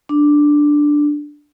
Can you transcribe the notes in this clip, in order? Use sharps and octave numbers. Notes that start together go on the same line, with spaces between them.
D4